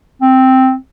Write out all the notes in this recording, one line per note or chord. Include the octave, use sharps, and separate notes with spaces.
C4